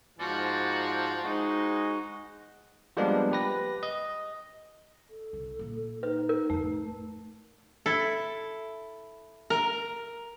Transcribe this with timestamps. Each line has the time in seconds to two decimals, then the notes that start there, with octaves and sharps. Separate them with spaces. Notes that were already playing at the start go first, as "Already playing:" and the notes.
0.19 G#2 F3 F#4 D5
1.23 G#3 D#4 F#4 C5
2.97 F3 G3 G#3 A#3 B3 D4
3.32 G4 B4 A#6
3.83 D#5
5.10 A4
5.33 C2
5.59 A#2 A3
6.03 D#4 B4
6.29 A#4
6.50 F2 A2 A3
7.86 E4 A4
9.50 A#4